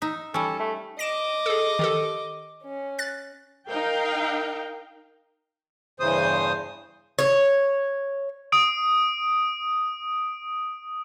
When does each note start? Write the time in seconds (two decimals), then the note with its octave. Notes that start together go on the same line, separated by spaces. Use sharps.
0.02 D#4 E5
0.34 G3 C#4 A4
0.60 A3
0.99 D#5 D6 A#6 D7 E7
1.46 G#4 A4
1.79 D#3 G4 A4
2.63 C#4
2.98 F#6 A6
3.67 D#4 A#4 F5 G5
6.00 E2 G2 C#3 E3 C5 D#6
7.19 C#5
8.52 D#6 D7